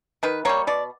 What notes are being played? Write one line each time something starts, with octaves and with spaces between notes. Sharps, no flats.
D#3 B4
G3 A#3 C#5
B2 D5